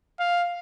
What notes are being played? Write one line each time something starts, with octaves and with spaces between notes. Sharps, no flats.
F5